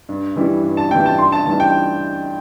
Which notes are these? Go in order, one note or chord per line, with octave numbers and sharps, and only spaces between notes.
G2
E3 G3 E4
G2
A5
E3 G3 E4 G5
A5
G2 C6
A5
E3 G3 D4 A5
G5